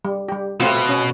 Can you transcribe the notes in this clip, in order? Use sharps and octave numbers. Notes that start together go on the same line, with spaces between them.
G3
G3 G4
B2 A3 C4 F4
C#4